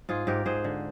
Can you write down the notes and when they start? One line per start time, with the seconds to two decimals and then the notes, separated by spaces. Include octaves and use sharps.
0.09 G#2 F4 G#4
0.27 G#2 G4 A#4
0.46 G#2 G#4 C5
0.64 D3